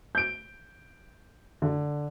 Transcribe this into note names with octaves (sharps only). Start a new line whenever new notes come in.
G6 D7
D3